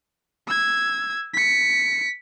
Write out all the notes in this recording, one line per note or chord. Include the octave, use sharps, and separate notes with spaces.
E6 G#6
B6 C#7